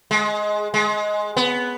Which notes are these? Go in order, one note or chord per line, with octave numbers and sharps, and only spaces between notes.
G#3
G#3
B3